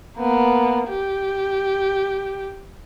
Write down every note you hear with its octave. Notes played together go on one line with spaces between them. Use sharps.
A#3 B3
G4